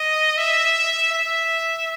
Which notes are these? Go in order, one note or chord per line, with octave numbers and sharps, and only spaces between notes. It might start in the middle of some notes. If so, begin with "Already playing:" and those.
Already playing: D#5
E5
E5